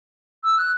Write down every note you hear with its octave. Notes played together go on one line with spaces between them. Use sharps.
E6
F#6